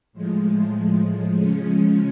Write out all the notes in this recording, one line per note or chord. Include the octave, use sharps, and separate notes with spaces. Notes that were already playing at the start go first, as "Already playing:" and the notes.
A2 F3 G#3
C#3 F3 G#3 C#4